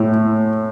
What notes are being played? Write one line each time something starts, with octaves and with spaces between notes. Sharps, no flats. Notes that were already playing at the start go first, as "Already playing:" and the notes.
Already playing: A2 E4